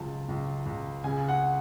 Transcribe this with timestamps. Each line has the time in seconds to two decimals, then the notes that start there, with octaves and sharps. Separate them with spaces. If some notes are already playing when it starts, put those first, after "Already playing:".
Already playing: C#2 F#3 A5
0.29 C#2
0.66 C#2
1.04 C#3 G#5
1.29 F#5